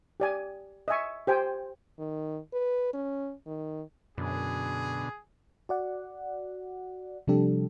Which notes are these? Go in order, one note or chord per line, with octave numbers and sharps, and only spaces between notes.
G4 D5 G#5
D#5 E5 G#5 C#6
G4 C5 G5 G#5
D#3
B4
C#4
D#3
F#2 B2 D3 G#4
F#4 D5 F#5
C3 F3 G3 D4 G4 A4